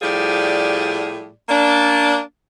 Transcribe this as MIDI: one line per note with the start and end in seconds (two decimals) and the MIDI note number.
0.02 1.31 45
0.02 1.31 53
0.02 1.31 55
0.02 1.31 68
0.02 1.31 74
1.49 2.19 58
1.49 2.19 61
1.49 2.19 62